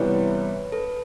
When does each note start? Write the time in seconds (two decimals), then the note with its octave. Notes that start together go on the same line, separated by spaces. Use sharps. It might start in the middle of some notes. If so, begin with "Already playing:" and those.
Already playing: C3 E3 G3 B3 B4 C#5
0.72 A4 B4